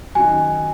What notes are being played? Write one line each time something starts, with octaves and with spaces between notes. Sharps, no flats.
D#3 F#3 C#4 F#4 G#5